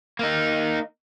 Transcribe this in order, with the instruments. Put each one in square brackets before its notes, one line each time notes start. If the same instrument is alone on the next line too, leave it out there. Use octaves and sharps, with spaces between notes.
[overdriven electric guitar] A#3 D#4